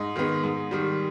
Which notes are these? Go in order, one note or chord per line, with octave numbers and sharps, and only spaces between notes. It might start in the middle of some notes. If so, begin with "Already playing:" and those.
Already playing: G#2 D#5
D#3 G#3 B3
G#2
D#3 G3